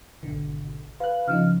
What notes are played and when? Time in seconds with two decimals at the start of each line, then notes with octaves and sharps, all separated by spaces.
0.23 G#1 B2 D3
1.00 B4 F5 F#6
1.28 C#3 F3 D#4 F6